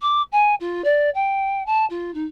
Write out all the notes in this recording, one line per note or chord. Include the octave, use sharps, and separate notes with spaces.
D6
G#5
F4
D5
G5
A5
F4
D#4